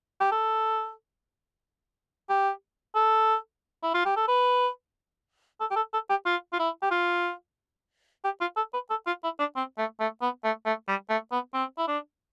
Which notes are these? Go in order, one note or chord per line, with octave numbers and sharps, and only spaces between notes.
G4
A4
G4
A4
E4
F4
G4
A4
B4
A4
G4
A4
A4
G4
F4
F4
E4
G4
F4
G4
F4
A4
B4
A4
F4
E4
D4
C4
A3
A3
B3
A3
A3
G3
A3
B3
C4
E4
D4